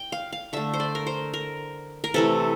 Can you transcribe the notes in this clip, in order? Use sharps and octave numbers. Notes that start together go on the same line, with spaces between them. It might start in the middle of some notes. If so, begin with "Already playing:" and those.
Already playing: G5
F5
F5
D3 A3 E5
C5
D5
A#4
C5
A#4
A#4
C3 E3 A3 A4